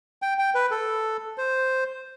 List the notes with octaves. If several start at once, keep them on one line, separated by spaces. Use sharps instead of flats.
G5
G5
B4
A4
C5